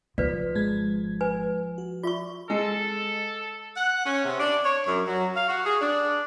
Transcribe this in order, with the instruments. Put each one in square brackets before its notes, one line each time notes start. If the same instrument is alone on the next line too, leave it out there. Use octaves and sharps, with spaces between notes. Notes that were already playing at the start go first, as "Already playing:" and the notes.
[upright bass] F3 [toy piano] B4 D5 [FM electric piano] B6
[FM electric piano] G#1 G#3 G#6
[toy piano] B4 G#5
[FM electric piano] F#4
[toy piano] F4 C#6 [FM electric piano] D5 E5
[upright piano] G#3 [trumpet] A4
[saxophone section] F#5
C#4
C3
D4
C#5
F#2
F#3
F5
F#4
G#4
D4